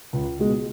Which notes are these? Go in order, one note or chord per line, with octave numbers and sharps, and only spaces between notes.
C#2
B2 G#3